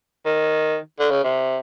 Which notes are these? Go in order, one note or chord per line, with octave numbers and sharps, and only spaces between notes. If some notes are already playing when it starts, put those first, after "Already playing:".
D#3
D3
C#3
C3